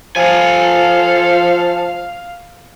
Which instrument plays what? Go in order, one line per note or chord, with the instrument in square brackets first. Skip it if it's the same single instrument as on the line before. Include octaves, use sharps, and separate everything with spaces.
[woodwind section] F3 [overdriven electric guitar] A4 G#5 [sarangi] F5